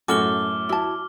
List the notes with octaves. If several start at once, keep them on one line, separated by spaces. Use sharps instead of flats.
F#2 A2 C#4 F#4 A4 D6 F6 G7
F#3 E4 A5